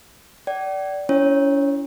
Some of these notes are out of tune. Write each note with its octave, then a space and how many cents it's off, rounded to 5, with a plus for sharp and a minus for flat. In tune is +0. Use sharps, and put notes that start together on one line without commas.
D5 -15 G5 -45
C#4 +40 E4 +20 C#5 -20